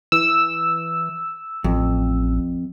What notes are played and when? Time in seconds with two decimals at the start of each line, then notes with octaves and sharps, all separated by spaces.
0.12 E3 E6
1.64 A1 F2